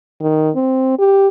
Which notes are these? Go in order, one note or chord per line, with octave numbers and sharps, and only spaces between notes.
D#3
C4
G4